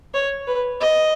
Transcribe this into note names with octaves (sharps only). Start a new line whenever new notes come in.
C#5
B4
D#5